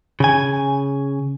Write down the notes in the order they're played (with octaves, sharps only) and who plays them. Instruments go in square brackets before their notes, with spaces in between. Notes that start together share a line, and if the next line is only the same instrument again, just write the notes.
[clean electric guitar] C#3 G#5